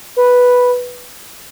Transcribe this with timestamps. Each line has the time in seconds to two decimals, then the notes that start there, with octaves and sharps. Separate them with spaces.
0.17 B4